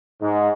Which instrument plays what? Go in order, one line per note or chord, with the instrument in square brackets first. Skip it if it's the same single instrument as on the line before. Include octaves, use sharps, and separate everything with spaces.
[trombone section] G#2